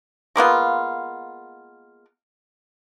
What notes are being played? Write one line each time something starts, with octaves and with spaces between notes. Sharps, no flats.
G#3 A#3 B3 F4